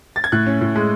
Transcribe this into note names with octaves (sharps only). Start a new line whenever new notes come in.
A6
G#6
A2 F#6
C#4
A2
G#3